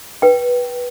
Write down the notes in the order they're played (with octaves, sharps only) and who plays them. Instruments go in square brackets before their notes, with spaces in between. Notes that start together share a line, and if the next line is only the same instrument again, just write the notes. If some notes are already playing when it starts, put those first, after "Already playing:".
[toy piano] B4 G5